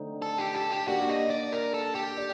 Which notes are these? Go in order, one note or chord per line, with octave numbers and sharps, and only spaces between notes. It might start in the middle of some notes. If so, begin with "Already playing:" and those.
Already playing: D3 A3 C4 D#4
A4
G4
A4
G4
A#3 D4 F#4 G4
D#5
D5
A#4
A4
G4
D5